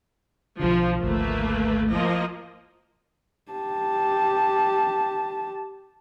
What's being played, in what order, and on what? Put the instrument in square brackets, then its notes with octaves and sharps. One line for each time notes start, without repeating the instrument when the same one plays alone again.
[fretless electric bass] B1 D3 [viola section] F3
[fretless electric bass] G#1 D2 [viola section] A3 A#3 B4
[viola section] F3 A#3 D#5
[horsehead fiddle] G4 A5